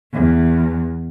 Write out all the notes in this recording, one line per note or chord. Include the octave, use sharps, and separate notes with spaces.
E2